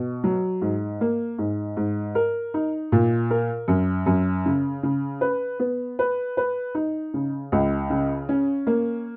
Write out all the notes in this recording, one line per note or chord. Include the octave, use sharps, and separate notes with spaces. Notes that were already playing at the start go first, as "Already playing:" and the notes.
Already playing: B2
F#3
G#2
A#3
G#2
G#2
A#4
D#4
A#2
A#4
F#2
F#2
C#3
C#3
B4
B3
B4
B4
D#4
C#3
C#2
C#3
C#4
A#3